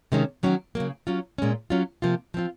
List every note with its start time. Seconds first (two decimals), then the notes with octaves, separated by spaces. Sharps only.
0.12 C3 D#3 G#3 C#4
0.43 D#3 F#3 C#4 F#4
0.75 C#3 F#3 A#3
1.07 F#3 C#4 F4
1.38 A#2 G#3 C#4
1.70 F#3 C#4 F4
2.02 C3 F3 A#3 F4
2.34 F3 C4 F4